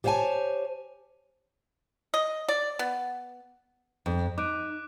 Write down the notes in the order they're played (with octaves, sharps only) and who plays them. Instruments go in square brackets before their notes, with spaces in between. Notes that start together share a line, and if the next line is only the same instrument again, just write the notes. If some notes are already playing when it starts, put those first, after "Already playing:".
[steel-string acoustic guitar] G4 C5 C#5 F5 G#5 A5
[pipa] D#5
D5
B3
[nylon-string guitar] F2
[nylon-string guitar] D#4 [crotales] D6 F#6 D7